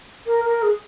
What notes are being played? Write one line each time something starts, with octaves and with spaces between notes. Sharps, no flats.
A#4
A#4
G#4